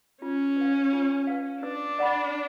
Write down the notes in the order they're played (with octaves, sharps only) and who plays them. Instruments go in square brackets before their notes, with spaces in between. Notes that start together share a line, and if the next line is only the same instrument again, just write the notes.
[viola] C#4 [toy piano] F4
[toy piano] B4 F5
F4
B4 F5
[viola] D4 [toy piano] B4
[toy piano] D5 F#5 B5